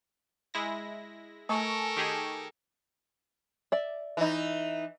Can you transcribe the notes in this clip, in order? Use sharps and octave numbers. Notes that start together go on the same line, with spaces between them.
G#3 E4 A#6
A3 A4 A#4 G#5 A5 C#6
D#3 G4 G#4
D5 E5
E3 D#4